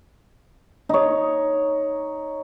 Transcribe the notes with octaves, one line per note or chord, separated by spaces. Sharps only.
D#4 C#5